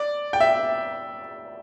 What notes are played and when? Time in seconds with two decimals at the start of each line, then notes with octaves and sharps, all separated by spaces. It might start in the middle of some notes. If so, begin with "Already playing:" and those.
Already playing: D5
0.33 G5
0.40 E5